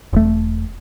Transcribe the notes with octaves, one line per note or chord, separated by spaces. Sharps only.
E1 A3